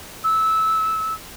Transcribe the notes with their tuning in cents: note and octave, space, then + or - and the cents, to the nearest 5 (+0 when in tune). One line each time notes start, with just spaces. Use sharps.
E6 -15